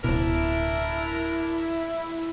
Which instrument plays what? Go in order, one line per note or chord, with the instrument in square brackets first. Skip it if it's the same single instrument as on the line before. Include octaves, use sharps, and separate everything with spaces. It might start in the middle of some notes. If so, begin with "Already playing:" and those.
[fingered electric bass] D1 B2 [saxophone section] D4 A#4 [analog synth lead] E4